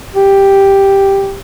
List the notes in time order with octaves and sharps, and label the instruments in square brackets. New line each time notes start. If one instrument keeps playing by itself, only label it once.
[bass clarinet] G4